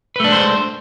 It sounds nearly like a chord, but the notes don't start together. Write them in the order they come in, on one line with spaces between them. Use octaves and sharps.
B4 A3 D4 G#3 C5